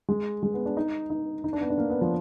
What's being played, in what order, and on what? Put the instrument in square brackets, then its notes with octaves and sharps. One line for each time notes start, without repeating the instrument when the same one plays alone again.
[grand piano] G#3
G#3
B3
D4
D#4
D#4
D#4
D4
B3
D4
A#3
B3
F3